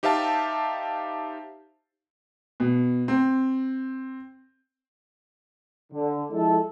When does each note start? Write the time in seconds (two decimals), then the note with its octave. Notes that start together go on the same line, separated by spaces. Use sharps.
0.03 D#4 G4 C5 E5 F5 A5
2.60 B2
3.08 C4
5.93 D3
6.31 F3 G#3 E4 A4